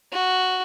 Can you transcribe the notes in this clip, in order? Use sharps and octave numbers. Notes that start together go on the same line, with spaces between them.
F#4